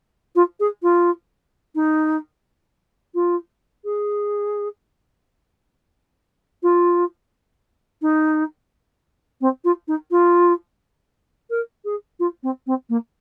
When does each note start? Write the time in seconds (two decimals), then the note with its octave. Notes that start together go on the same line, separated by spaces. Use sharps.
0.36 F4
0.60 G#4
0.83 F4
1.75 D#4
3.15 F4
3.85 G#4
6.63 F4
8.02 D#4
9.41 C4
9.65 F4
9.88 D#4
10.11 F4
11.50 A#4
11.85 G#4
12.20 F4
12.43 C4
12.67 C4
12.90 A#3